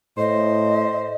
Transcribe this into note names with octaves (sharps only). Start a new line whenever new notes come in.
A2 C5 D#5